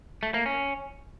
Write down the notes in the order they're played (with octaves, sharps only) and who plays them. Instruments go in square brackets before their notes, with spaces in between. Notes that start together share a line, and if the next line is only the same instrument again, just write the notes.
[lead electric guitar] A3
A#3
C#4